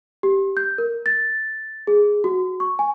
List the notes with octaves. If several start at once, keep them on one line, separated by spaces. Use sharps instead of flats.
G4
G6
A#4
A6
G#4
F#4
C#6
G#5